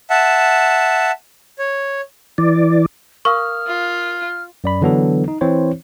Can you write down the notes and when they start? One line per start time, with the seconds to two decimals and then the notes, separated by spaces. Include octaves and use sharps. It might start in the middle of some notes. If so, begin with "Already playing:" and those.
0.10 E5 F#5 A5
1.59 C#5
2.38 E3 D5
3.25 A#4 F5 C#6 D#6 F6
3.67 F4
4.64 F#2 D5 B5
4.81 D3 E3 F#3 B3 D4 A4
5.28 D#4
5.41 E3 C4 E4 C5 C#5